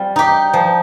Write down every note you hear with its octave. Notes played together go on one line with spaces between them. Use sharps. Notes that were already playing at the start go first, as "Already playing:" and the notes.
Already playing: G3 C4 F4
D#4 G4
F3